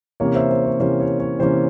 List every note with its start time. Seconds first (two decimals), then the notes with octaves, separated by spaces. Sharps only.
0.20 C3 E3 A#3 C#4 C#5
0.35 C5 E5
0.51 C5
0.65 C#5
0.79 C3 E3 A#3 C#4 C5
1.00 C#5
1.19 C#5
1.39 C3 E3 A#3 C#4 C5